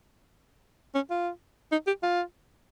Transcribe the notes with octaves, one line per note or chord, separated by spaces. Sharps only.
C#4
F4
D#4
G4
F4